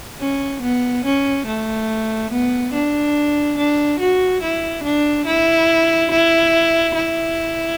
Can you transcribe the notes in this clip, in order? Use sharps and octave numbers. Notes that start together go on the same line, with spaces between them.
C#4
B3
C#4
A3
B3
D4
D4
F#4
E4
D4
E4
E4
E4